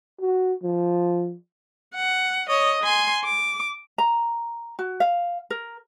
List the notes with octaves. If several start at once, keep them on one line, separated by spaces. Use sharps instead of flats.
F#4
F3
F#5
C#5 D#5
G#5 C6
D6
A#5
F#4
F5
A#4